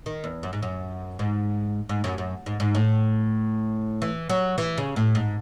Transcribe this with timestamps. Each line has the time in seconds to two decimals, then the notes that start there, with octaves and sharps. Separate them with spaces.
0.06 D#3
0.24 E2
0.43 F#2
0.53 G#2
0.62 F#2
1.19 G#2
1.89 G#2
2.04 F#2
2.18 F#2
2.46 G#2
2.60 G#2
2.75 A2
4.02 E3
4.29 F#3
4.58 E3
4.78 C#3
4.96 A2
5.15 G#2